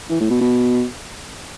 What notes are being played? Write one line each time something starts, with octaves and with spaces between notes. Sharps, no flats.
E3
A2
B2
B2